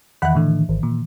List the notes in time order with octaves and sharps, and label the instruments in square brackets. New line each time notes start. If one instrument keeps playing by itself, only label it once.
[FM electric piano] E2 F#5 B5 [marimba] D#3 E3
[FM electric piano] A2 D3
G#1
A#2